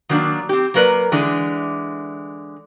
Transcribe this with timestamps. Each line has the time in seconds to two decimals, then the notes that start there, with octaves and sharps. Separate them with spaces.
0.09 D#3 F#3 A#3 D4
0.49 C4 G4
0.74 F#3 A#3 A#4 B4 D5
1.12 D3 E3 G#3 D4